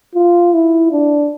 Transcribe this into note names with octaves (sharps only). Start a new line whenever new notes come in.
F4
E4
D4